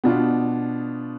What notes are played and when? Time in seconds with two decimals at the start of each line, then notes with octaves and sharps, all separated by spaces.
0.04 B2 B3 D4 F4